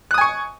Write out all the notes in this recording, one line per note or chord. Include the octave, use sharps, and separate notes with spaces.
G#5 C#6 D#6 F#6